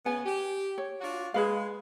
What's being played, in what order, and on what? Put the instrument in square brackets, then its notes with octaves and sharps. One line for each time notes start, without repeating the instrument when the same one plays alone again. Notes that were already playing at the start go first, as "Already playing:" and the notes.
[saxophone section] C#3 B3 [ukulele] G#5
[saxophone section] G4
[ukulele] C#5
[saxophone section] D4 F4 F#4
[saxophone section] G#3 [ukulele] G#4 B4 F5